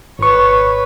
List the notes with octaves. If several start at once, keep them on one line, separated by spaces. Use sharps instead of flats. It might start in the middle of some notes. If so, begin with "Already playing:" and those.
G#1 B4 C#5 C#6